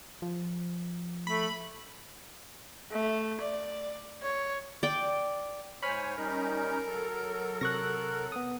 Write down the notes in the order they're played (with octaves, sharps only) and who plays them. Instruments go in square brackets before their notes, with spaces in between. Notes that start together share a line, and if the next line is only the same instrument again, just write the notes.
[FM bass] F3
[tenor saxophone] A3 [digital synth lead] B5
[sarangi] A3
D5
C#5
[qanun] D5 G5
[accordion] G#2 C5 G#5 [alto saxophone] C#5 [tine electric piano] B5 F6 B6
[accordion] G3 C#4 D#4 [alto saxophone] A#4
[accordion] F#3 A4
[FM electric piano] C3 F#6 [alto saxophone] A#4 [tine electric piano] C#6 A#6
[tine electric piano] B3 D#6